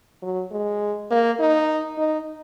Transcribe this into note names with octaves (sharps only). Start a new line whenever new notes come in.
F#3
G#3
A#3
D#4
D#4